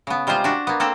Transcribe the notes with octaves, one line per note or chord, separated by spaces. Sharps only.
C#3 B3
C3 G3 G#3 F4 C5
D4 F#4
A#3 B3
A#3 C4 A4